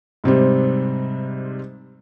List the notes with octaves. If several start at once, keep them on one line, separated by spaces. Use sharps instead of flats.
G#2 C3 G3 C4